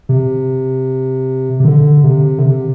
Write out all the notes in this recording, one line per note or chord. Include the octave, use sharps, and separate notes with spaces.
C3
C3
D3
C3
D3
C3